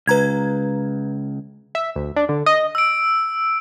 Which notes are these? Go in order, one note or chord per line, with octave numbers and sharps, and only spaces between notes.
C#2 B4 A#5 G#6
E5
D2
D4
D3
D#5
E6 D7